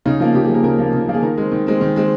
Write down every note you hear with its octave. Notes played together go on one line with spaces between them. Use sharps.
C#3 D#4
F3 A#3 F4
C#3 G4
G#4
F3 A#3 A#4
C#3 A#4
F3 A#3
C#3
F3 A#3
G#4
D#3 A#4
G#3 C4
D#3
G#3 C4
D#3
G#3 C4